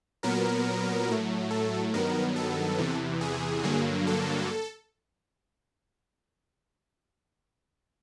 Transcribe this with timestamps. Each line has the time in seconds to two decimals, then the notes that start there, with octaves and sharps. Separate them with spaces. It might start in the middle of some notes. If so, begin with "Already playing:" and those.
0.23 A#2 F#3 B3 A#4
1.08 A2 F#3 A3
1.51 A4
1.94 G2 D#3 F#3 B3 A#4
2.36 A4
2.78 E2 C3 E3
3.21 G#4
3.64 G2 D3 F#3 A#3
4.07 A4